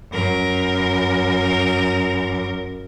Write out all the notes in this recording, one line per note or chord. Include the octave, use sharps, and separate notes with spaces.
F#2 A#4